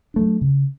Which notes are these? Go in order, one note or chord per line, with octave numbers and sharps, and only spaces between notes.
F#3 A3 D4
C#3